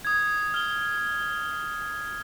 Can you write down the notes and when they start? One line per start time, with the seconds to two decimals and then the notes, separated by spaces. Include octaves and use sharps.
0.05 D#6 G#6
0.54 F6 G7